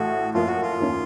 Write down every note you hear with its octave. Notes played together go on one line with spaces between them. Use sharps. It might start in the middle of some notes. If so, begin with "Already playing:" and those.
Already playing: A1 A2 A3 F#4
F#2 F3 A#3 F4
F#4
F4
D#2 D#3 A#3 C#4